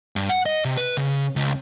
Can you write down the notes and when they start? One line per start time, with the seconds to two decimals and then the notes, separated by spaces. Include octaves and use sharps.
0.16 G2
0.29 F#5
0.46 D#5
0.65 C3
0.77 B4
0.97 C#3
1.36 C#2